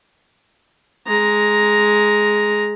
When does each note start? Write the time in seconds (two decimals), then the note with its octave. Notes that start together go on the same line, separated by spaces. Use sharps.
1.06 G#3 A#5